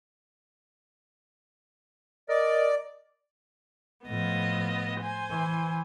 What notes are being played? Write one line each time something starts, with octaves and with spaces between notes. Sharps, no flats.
A#4 D5 D#5
A2 F3 B3 D#5
C5 G#5
E3